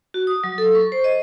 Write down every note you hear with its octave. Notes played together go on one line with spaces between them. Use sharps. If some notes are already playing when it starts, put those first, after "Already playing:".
F#4
D#6
F#3
A4
C#6
C5
D#5